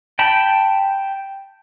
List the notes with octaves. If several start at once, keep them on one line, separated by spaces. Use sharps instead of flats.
G5 A5 B5